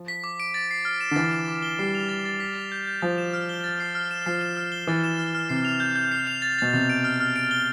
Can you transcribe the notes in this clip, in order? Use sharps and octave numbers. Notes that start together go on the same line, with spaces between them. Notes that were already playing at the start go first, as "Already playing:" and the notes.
Already playing: F3
B6
D6
D7
A6
C7
F6
E7
D3
E3 A6
E7
D6
G7
G3 C7
F7
A6
A6
B6
F7
G6
G6
F3 A6
E7
F6
G7
A6
C7
F6
E7
F3 C7
E7
F6
G7
E3 A6
E7
F6
F6
C3 C7
F7
G6
G6
C7
F7
A6
B2 A6
C3 A6
D7
F6
F6
D7
G7